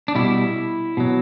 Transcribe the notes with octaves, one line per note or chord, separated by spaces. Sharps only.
D4
B2 G3 E4
B2 F#3